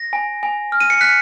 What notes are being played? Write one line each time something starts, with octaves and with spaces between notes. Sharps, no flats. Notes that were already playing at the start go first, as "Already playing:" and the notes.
Already playing: A#6
G#5
G#5
F6
D#7
C#7
F#6 B6